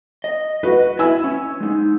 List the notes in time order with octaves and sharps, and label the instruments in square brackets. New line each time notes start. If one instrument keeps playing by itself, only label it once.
[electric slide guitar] D#5
[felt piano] F#4 B4
[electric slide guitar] E4 E5 [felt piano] G#5 E6
[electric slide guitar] C#4
G#3 D#4